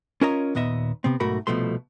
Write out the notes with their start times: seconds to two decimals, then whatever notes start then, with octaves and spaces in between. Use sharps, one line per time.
0.21 C#4 F4 A#4 C#5 D#5 A#5
0.55 D#2 A#2 B3 D#5 E5
1.04 C3 B3 C4
1.20 B1 G#2 A3 F#4 A#4 B5
1.47 C2 B2 F3 A3 C6